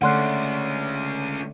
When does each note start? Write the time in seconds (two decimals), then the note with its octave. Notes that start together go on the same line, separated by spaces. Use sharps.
0.02 D3 G#3 A3 C#4 D5 F#5 C6 F#6